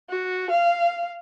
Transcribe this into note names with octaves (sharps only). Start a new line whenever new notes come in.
F#4
F5